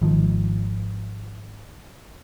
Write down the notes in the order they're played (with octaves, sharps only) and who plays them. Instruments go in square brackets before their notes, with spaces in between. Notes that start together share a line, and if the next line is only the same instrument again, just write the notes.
[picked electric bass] G#1 G#2 D#3 F3